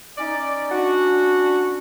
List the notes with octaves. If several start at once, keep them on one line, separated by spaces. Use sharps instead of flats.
C#4 D#4 D5
C#4 D4 F#4